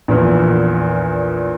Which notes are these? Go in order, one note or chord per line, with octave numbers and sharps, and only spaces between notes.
A#1 E2 A#2